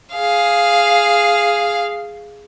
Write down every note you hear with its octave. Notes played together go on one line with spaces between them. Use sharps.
G#4 F5